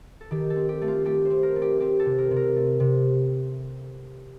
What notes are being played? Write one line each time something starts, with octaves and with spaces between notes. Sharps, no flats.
A4
D#3 G4
A4
C4
G4
A3
F4
A3 G4
C5
C4
A#4
A3
G4
C4 G4
A4
C3
A#4
C3
A#4
A3
C3